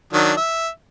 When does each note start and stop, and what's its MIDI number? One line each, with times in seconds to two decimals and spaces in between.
0.13 0.32 51
0.13 0.32 54
0.13 0.32 62
0.37 0.69 76